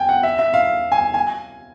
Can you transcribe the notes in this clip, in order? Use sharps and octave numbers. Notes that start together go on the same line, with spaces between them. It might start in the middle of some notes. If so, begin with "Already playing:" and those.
Already playing: G5 G#5
F#5
E5
E5
F5
G#5
G#5